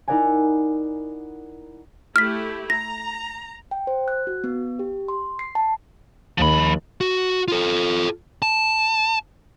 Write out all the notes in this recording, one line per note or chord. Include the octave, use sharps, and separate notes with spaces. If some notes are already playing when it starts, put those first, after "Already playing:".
D#4 E4 A#4 D5 F#5 G#5
A3 E4 G4 F6 B6
A#5 A#6
G5
C5
F#6
F#4
B3
G4
C6
C7
A5
D#2 F3 B5
F#4
F4 A4
A5